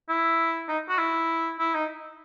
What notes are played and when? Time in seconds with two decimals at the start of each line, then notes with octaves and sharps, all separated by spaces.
0.09 E4
0.68 D#4
0.89 F#4
0.98 E4
1.59 E4
1.74 D#4